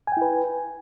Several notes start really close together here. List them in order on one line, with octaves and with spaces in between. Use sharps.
G#5 G5 E4 B4